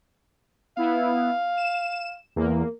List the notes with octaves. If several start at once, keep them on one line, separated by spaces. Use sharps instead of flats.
B3 E4 F5
E7
E2 A#3